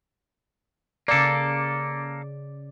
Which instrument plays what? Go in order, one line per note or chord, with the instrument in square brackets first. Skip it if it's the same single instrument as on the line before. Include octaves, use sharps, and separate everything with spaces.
[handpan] C#3 D5 [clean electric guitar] A#3 A4